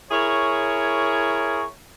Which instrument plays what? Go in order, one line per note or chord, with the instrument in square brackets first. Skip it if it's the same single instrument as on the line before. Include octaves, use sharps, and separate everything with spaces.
[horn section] E4 G#4 A#4 C#5